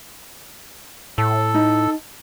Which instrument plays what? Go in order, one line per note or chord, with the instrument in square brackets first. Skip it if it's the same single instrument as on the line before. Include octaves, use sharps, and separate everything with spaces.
[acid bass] A2 [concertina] A4
[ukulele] D#4